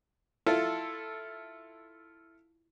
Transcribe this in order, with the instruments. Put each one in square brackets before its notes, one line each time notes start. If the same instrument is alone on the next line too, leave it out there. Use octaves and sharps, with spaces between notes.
[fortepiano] E4 F4 A4